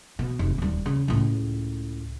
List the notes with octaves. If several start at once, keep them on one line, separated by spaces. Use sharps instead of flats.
B2
F1
D#1 G3
C#3
C#2 A2